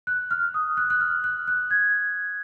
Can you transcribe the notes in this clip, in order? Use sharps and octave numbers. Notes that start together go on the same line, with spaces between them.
F#6
F6
D#6
F#6
F#6
F6
F#6
F#6
G#6